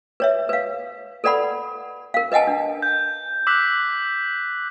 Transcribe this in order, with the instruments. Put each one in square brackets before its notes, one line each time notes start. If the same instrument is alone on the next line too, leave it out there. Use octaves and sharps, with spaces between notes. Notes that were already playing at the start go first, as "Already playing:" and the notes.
[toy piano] B4 C#5 E5
B4 F5
A4 B4 D5 F#5 B5
A#4 F5
B4 D#5 F#5 G#5 A5
D4
[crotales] G6
D6 E6 F#6 B6